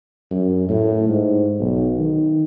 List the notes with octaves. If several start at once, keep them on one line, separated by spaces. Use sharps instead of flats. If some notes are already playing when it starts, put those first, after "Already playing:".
F#2
A2
G#2
B1
D#3